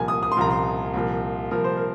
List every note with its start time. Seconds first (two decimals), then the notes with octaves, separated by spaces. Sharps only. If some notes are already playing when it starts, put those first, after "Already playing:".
Already playing: C2 A#2 F3 G#5
0.08 D#6
0.23 D#6
0.32 C6
0.37 C2 A#2 F3 A#5
0.50 C6
0.94 C2 A#2 F3
1.51 C2 A#2 F3 A#4
1.64 C5
1.77 A#4